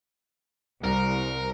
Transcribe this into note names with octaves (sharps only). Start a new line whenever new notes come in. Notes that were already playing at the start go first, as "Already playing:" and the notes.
C2 A#4